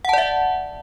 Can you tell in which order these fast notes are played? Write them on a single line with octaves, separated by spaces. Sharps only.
F#5 A5 D5 E5